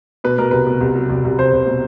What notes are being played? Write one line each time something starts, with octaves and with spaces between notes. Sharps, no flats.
B2 B4
B2 A#4
C2 B4
B2
C2
F#3
C2
C2
C2 C5
C2
B2